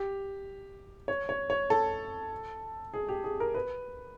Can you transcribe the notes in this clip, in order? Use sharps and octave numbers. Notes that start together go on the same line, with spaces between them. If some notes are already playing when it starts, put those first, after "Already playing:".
Already playing: G4
C#5
C#5
C#5
A4
G#4
G4
G#4
A#4
B4